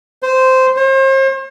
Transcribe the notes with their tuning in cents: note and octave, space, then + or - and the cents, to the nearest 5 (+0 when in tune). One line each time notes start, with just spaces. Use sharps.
C5 -10
C5 +40